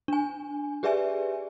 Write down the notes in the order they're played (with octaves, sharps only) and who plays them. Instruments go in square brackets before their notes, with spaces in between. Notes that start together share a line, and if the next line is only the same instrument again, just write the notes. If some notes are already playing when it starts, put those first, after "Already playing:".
[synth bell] D4 G#5
G4 G#4 B4 D5 E5 G#5